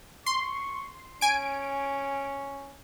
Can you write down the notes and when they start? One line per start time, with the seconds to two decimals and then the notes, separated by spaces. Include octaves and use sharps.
0.26 C6 C#6
1.21 C#4 G#5 D7